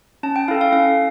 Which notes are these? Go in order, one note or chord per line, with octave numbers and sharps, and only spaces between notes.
C#4 A5
G5
E4 A4 F5
F5
C#4 F5